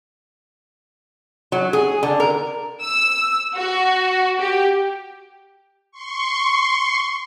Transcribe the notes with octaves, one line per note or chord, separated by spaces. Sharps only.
F#3
G#4
D3
A#4
E6
F#4
G4
C6 C#6